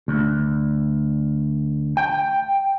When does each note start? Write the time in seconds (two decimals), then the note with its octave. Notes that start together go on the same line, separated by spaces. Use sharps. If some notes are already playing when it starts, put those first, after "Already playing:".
0.08 D2
1.97 G5